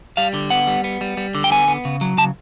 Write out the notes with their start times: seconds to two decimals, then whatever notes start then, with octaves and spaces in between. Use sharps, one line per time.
0.17 G3 F5
0.34 D3
0.50 B3 F#5
0.67 G3
0.84 B3
1.01 G3
1.17 G3
1.35 D3
1.44 G5
1.52 B3 G#5
1.68 B3
1.85 C#3
2.01 F#3
2.18 C#3 A5